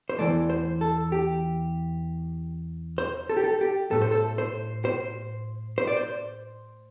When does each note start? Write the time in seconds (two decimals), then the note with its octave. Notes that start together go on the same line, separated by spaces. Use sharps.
0.10 C5
0.19 E2 E3 A3 D5
0.50 C5
0.81 A4
1.12 G4
2.98 C5
3.29 A4
3.37 G4
3.44 A4
3.61 G4
3.91 A2 A3 A4
4.02 C5
4.11 A4
4.38 C5
4.85 C5
5.78 C5
5.87 D5
5.97 C5